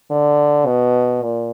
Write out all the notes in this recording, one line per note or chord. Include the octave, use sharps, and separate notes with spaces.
D3
B2
A#2